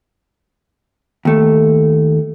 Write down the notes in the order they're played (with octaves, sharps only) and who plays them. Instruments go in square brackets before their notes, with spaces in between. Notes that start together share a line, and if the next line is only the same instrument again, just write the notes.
[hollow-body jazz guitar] D#2 A3